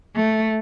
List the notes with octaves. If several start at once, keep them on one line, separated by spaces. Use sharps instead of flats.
A3